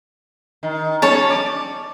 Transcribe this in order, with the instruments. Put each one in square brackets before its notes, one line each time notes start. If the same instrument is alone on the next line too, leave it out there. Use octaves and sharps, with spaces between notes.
[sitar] D#3
[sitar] G3 C#4 [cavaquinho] C#5 A5
[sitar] D5